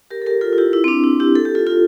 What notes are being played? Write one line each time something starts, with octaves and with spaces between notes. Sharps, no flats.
G4 A#4
A4
G4 A#4
F4 A4
F4
E4 G4
E4
C4
D4
E4
E4 G4
A4
G4
F4 A4
F4 A4